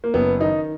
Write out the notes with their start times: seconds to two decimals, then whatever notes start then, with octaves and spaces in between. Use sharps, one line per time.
0.04 A#3
0.14 F#1 B3
0.40 D#3 D#4